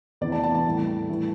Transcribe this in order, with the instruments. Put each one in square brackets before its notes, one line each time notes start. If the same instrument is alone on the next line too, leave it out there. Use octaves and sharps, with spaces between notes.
[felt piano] E2 C3 E3 D5
A5
A5
A5
A2 E3 G3
A2 E3 G3